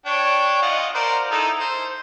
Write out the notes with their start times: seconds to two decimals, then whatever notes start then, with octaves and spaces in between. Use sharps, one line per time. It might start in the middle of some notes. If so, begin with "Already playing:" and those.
0.06 D4 C#5 G5
0.62 F4 D#5 F#5
0.95 A#4 C5 D5
1.32 D#4 E4 A4
1.60 C5